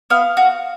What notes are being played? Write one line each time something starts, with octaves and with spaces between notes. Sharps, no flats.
B3 F5
F#4